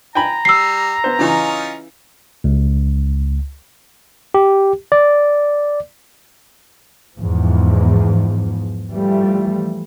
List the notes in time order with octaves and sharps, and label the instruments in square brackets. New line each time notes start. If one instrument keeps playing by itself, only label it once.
[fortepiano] G5 G#5 B5 [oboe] A#5
[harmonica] G3 [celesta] E6 C7
[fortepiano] B3 C5
[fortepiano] C#3 E3 [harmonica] C#4 D#4 F4
[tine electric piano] C#2
G4
D5
[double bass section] E2 G#2 F3
E3 F3 G3 A3